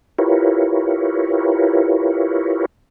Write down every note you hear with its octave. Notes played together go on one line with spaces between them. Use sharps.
E4 F4 G4 A#4 B4 C#5